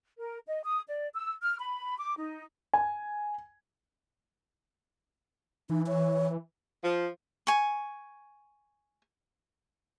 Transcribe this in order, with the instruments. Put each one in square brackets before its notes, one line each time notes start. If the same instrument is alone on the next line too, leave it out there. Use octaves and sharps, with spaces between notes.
[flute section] A#4
D#5
D#6
D5
E6
F6
B5
D6
D#4
[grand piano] G#5
[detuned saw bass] E3 [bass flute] D#4
[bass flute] C#5
[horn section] F3
[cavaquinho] G#5 C#6